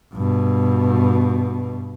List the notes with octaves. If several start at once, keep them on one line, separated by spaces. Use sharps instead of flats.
G2 B2